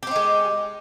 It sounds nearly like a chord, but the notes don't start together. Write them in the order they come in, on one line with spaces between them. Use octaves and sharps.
G4 C4 D#4 G#3